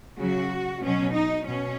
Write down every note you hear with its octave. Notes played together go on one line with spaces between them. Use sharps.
C#3 F#3 F#4
B2 F#3 C#4
D#4
B2 C#4